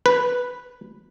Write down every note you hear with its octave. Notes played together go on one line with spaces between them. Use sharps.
B4